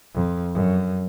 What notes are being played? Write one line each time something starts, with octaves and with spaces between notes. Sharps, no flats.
F2
F#2